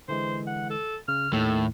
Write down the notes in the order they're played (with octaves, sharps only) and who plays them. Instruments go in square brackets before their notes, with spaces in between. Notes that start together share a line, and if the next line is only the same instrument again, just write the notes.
[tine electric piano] D3 E3 G#3 [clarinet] C5
[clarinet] F#5
A4
[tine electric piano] C#3 [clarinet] F6
[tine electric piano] D#2 D#3 [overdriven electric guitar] A2 [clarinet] A4